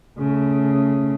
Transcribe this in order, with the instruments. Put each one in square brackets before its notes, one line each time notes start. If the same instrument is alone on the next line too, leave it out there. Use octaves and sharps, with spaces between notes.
[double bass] C#3 A3